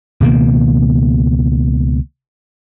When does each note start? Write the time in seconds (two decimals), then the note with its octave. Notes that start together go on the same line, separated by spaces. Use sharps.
0.20 C#2 B2 D#3 A#3